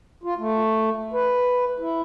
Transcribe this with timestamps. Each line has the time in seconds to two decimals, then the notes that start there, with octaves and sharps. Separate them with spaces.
0.24 F4
0.38 A3
1.13 B4
1.80 E4